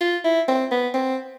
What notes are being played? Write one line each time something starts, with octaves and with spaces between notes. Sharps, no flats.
F4
E4
C4
B3
C4